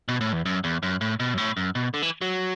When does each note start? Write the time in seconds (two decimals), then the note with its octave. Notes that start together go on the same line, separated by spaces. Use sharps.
0.08 B2
0.21 A2
0.33 E2
0.45 F#2
0.64 E2
0.83 F#2
1.01 A2
1.20 B2
1.34 F#2
1.38 A2
1.57 F#2
1.75 B2
1.94 D3
2.03 E3
2.22 F#3